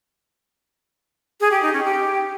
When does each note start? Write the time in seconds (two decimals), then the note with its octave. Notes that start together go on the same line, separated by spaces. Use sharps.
1.40 G#4
1.51 G4
1.62 D#4
1.73 C#4
1.84 G4